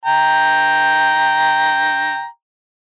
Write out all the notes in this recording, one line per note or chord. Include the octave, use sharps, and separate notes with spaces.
G5 A#5